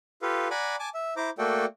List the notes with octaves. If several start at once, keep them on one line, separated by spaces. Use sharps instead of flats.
F4 G4 A4 B4 F5
D5 F#5 G#5 A#5 B5 D6
G#5 A5 D6
E5
E4 C5 A#5 D6
A3 A#3 F#4 A4 D5 G5